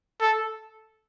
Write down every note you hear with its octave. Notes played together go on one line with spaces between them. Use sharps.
A4